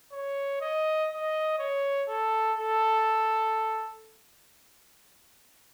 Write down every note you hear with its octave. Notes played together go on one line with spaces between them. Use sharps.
C#5
D#5
D#5
C#5
A4
A4